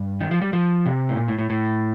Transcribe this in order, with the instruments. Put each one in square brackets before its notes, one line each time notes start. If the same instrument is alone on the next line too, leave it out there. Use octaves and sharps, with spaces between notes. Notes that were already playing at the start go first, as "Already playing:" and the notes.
Already playing: [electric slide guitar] G2
D#3
F3
G3
F3
C3
A2
A#2
A2
A2
A2